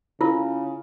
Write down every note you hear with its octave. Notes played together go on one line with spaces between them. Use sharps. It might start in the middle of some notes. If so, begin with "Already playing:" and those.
C#3 E4 F4